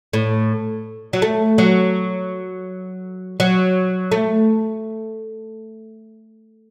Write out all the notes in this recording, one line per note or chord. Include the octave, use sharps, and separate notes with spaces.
A2
F#3
A3
F#3
F#3
A3